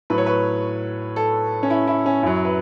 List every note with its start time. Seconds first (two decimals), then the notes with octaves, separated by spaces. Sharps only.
0.10 A2 F#3 B4
0.18 C#5
0.26 B4
1.16 A4
1.63 C#4
1.70 E4
1.87 E4
2.06 C#4
2.23 F#2 F#3 E4
2.45 B4